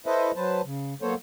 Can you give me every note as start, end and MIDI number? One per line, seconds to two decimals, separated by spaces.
0.06 0.31 64
0.06 0.31 69
0.06 0.31 71
0.06 0.31 72
0.06 0.31 75
0.06 0.31 76
0.36 0.61 54
0.36 0.61 71
0.36 0.61 72
0.36 0.61 81
0.65 0.94 49
1.02 1.15 54
1.02 1.15 58
1.02 1.15 59
1.02 1.15 69
1.02 1.15 72
1.02 1.15 73